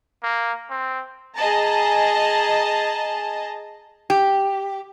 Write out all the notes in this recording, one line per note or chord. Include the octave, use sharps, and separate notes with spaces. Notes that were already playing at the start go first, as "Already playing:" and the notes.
A#3
C4
G#4 D#5 A5 A#5
G4